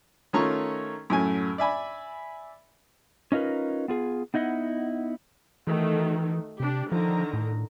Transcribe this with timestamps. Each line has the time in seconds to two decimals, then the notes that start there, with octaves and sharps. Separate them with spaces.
0.33 D#3 A3 C#4 F4 A#5 C#6
1.10 F#2 A2 A3 G#5
1.58 D5 E5 G#5 B5
3.32 C#4 D#4 F4 A#4 B4
3.88 B3 F4 G#4
4.34 B3 D#4 E4 D#5 F#5
5.67 D#3 E3 A3 F#4
6.60 C3 D4 G4
6.92 D3 D#3 F3 A#5
7.33 A2